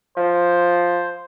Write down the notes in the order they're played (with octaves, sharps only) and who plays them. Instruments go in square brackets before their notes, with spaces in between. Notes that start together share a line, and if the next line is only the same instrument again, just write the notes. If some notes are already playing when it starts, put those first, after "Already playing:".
[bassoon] F3 [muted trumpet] C5